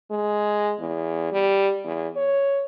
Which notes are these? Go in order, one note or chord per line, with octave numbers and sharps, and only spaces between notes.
G#3
E2
G3
E2
C#5